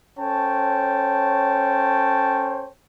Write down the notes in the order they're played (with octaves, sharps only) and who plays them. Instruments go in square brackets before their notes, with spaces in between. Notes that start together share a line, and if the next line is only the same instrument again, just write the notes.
[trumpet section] C#4 A4 C5 C#5 G5 A5